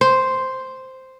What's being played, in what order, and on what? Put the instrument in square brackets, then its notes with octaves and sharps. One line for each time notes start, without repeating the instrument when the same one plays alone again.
[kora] C5